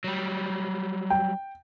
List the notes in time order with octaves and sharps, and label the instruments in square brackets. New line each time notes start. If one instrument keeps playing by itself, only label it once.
[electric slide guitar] F#3 G3
[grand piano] G5